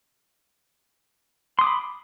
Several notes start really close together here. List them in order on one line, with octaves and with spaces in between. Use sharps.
C6 D#6 D6 B5